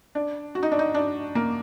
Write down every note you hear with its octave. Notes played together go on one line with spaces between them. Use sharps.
D4
F#4
D#4
D4
D#4
D4
A#3